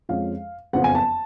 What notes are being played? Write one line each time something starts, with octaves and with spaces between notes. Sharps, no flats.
F2 F3 G#3 C#4 F5
F#1 F2 F3 B3 F4 F#5
G#5
A5